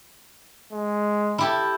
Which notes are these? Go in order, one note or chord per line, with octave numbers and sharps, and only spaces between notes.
G#3
E4 G4 A4